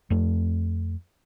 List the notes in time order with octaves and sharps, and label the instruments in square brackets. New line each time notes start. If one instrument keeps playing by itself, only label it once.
[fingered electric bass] F2 A3